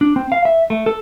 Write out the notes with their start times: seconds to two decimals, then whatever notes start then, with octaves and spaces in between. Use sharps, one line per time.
0.01 D4
0.16 C4
0.32 F5
0.45 E5
0.70 A3
0.86 A4